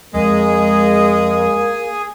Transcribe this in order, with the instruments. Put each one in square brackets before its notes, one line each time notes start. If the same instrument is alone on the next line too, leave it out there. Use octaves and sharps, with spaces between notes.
[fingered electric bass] F2 [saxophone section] G#3 [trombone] A#3 [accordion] G#4 G#5